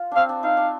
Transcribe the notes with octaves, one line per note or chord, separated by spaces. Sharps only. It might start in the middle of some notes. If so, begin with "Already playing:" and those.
Already playing: F4
C4 D4 F5
D4
D#4 F5
D4